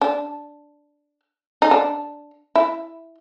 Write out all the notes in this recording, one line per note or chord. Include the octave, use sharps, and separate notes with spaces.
D4
D#4
D4
E4